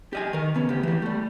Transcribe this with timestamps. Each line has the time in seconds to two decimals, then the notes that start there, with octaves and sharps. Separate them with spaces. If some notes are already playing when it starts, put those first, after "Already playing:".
0.13 G4 D#5 G#5
0.33 D#3 A#4
0.54 C#3 B3 C#4
0.69 D2 G4
0.83 E3 G4
1.02 G3 A3